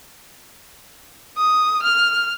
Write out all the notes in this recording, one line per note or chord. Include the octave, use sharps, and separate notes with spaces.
D#6
F6